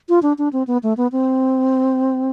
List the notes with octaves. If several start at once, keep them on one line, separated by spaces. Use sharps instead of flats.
F4
D4
D4
C4
B3
A3
B3
C4